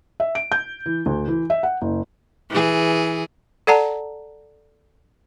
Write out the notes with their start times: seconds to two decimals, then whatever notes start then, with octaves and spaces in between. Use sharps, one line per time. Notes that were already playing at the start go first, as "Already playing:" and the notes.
0.20 E5
0.35 D7
0.52 G6
0.86 E3
1.06 D2
1.28 E3
1.50 E5
1.63 F#5
1.82 F#1
2.50 E3 G#4
3.67 A4 D5 F#5 A5 A#5